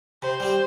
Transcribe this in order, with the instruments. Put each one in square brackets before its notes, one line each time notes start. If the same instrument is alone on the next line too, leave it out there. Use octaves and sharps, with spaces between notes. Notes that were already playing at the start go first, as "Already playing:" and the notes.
[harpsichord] C3 [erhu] C5
[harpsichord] G3 C4 G4